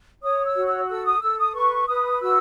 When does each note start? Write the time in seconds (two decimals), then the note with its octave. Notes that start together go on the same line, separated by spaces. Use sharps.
0.23 C#5 D#6
0.46 E6
0.56 F#4
0.67 E6
0.89 A4 E6
1.06 D#6
1.22 A4 E6
1.39 D#6
1.55 B4 C#6
1.88 B4 D#6
2.21 F#4 E6